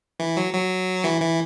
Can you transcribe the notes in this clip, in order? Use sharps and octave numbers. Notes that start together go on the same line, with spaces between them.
E3
F#3
F#3
E3
E3